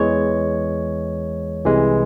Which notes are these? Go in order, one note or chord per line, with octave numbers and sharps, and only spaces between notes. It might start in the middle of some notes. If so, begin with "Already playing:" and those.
Already playing: E2 E3 G#3 C#5
C2 C3 E3 G#3